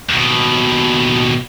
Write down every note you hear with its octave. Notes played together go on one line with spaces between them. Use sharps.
D#2 B2